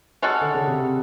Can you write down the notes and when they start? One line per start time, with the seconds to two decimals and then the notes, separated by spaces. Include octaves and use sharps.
0.22 G#3 C#4 F#4 A4
0.41 D3
0.54 C#3
0.67 C3